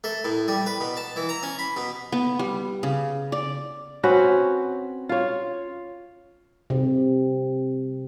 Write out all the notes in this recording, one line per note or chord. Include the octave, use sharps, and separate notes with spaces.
A3
A2
G3
B4
B2
A5
E3
A#5
C#4
B5
B2
B3
G3
C#3
D5
C4 C#4 F#4 B4
F4 C#5
C3